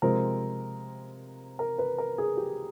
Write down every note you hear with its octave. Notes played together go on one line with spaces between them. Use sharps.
C3 F3 G#3 C4 A#4
A#4
B4
A#4
G#4
G4